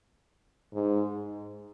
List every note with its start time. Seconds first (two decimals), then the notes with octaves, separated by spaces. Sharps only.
0.74 G#2